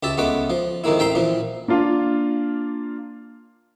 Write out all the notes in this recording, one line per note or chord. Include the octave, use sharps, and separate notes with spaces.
C#2 G4 E5 A5
C#2 G#3 A3 B3 B4 D6
F3
F2 D#3 G#3 A#3 E4
A1 E5 G5 A#5 C6
A#2 E3 F3
A#3 D4 F4 F5